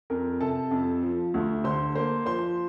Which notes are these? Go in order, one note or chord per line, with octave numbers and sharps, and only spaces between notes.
F2 A#4
C3 A4 A5
F2
F3
D2
D3 C5 C6
A#3 C5 C6
F3 C5 C6